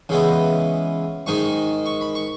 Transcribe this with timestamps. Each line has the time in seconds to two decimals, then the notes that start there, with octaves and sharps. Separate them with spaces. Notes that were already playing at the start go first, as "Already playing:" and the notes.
0.09 C#3 E3 G#3 B3 E4
1.26 G#2 D#3 G#3 D#4 C#6
1.86 C#6
2.01 B5
2.15 C#6